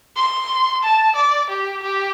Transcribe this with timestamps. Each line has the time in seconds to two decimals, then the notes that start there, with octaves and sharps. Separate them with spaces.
0.16 C6
0.83 A5
1.15 D5
1.49 G4
1.83 G4